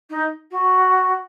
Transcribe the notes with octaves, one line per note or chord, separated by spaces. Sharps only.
D#4
F#4